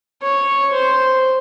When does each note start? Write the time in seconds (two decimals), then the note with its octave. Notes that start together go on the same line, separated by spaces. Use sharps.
0.22 C#5
0.72 C5